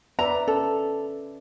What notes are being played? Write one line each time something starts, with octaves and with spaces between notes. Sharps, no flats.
B4 D5 E5 A#5
C#4 A4